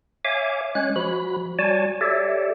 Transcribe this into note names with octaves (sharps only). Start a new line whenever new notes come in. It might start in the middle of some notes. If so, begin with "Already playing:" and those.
C#5 E5 F5 G#5 D6
G#3 C#4 C#5 F#6
F3 F#4 B5
G3 F#4 C#5 D5 G#5 A5
G4 A4 C#5 D5 E5